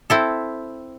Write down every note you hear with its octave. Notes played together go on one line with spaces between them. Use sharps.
C4 E4 A4